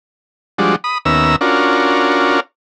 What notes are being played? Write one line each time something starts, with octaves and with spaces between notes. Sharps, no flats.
F3 G3 G#3 D4 F#4
B5 D#6
D#2 B3 C#4 E5 A#5 E6
C#4 D4 F4 F#4 A#4